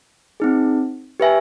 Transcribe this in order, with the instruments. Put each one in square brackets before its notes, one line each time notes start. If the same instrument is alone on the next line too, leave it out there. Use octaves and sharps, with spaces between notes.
[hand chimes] C4 D#4 G#4
G4 B4 E5 G#5